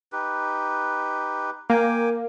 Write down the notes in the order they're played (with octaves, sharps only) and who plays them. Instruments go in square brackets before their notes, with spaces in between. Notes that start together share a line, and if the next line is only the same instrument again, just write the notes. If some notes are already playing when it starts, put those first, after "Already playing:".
[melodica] D#4 G4 B4
[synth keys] A#3 [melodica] G5 G#5 D6